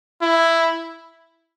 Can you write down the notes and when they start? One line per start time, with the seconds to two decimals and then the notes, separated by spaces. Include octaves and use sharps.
0.22 E4